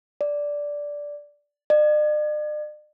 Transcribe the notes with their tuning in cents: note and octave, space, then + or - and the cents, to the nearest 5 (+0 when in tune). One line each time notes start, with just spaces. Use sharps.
D5 -5
D5 +45